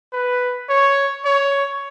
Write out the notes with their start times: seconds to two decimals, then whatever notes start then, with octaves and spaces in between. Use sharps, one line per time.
0.13 B4
0.69 C#5
1.25 C#5